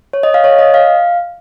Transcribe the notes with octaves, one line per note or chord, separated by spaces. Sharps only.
C#5
D#5
F5
C#5
D#5
F5